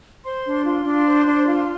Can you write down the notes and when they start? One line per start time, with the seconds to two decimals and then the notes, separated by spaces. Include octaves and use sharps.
0.25 C5 C6
0.45 D4
0.65 F4 C6
0.86 D4
1.06 C5
1.27 D4
1.47 F4